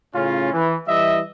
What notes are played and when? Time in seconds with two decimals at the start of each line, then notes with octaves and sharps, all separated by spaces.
0.14 A2 C#3 C#4 F4
0.53 E3
0.88 E3 G3 D#5 E5